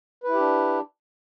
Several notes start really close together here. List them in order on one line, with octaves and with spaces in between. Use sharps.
B4 E4 G4 D4